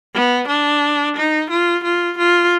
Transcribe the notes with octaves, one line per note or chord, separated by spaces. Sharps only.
B3
D4
D#4
F4
F4
F4